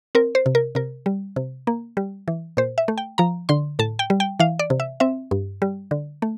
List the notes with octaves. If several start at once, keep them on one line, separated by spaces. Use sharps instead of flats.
C4 A#4
C5
C3
A#4
C3 A#4
G3
C3
A#3
G3
E3
A#2 C5
E5
A3
G5
F3 A#5
D3 C6
A2 A5
G5
G3
G5
E3 F5
D5
C3
E5
C4 E5
G2
G3
D3
A3